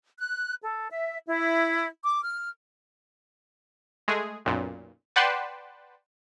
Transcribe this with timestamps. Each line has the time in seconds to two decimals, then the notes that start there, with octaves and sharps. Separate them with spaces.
0.18 F#6
0.62 A4
0.90 E5
1.27 E4
2.03 D6
2.22 F6
4.08 G#3 A3 G#4
4.45 B1 F#2 A#2
5.16 B4 D5 F#5 G5 A5 C6